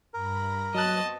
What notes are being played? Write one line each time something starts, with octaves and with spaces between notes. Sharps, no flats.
G2 A#4 B5 A#6
F#3 B3 C4 F#4 D#5 A5 F#6